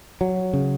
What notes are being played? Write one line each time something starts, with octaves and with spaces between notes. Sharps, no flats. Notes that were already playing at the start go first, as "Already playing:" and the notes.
F#3
C#3